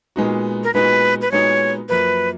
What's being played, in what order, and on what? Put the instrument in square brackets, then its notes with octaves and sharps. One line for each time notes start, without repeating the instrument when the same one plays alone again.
[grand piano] A#2 G#3 B3 D#4 F#4
[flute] A#4
[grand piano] A#2 G#3 B3 D#4 F#4 [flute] B4
[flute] B4
[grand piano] A#2 G#3 B3 D#4 F#4 [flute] C#5
[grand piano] F#2 F3 A#3 [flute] B4